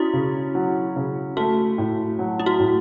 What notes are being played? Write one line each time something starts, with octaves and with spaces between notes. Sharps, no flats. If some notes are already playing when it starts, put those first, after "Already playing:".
Already playing: C#4 E4 F#4
C#3
F#3
C#3
A3 F#4
A2
F#3
E4
F#4
A2